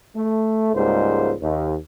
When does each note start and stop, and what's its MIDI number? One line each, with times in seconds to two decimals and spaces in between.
0.16 0.72 57
0.74 1.33 37
0.74 1.33 44
0.74 1.33 55
0.74 1.33 58
0.74 1.33 72
1.41 1.75 39